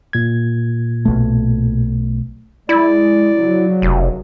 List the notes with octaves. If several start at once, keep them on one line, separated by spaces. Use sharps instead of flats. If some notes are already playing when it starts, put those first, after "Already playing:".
A#2 G#6
B1 A3
G#3 E4 D5
C#3 F#3
F1